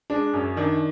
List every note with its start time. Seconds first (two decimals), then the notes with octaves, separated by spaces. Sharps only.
0.10 G#3 D4
0.34 F#2 C#4
0.57 D#3 D4